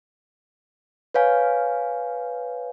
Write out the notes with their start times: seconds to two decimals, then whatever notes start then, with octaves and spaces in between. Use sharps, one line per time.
1.14 B4 C#5 F5 G#5